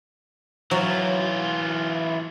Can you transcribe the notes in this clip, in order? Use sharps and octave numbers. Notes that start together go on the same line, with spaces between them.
E3 F#3 F4